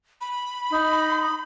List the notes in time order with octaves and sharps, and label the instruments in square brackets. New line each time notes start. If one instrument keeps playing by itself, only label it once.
[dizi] B5
[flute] D#4